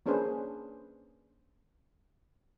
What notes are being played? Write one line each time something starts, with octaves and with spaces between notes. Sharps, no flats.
A#3 C#4 D4 G#4 B4 C5